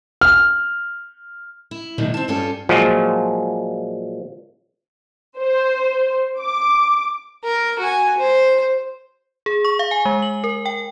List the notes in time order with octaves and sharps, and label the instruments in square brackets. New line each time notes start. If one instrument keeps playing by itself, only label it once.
[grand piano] F6
[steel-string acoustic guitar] E4
E2 B2 D3 D#3 G3 A3
C4 A5
G2 C#4 F4 G4 A4
[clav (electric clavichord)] A#2 F3 F#3 G#3
[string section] C5
D6
[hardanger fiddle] A#4
F#4 G#5
C5
[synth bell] G#4
C#6
F5
G#5
G#3
F#7
A#4
G5